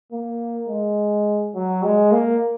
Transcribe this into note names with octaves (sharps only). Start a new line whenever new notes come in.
A#3
G#3
F#3
G#3
A#3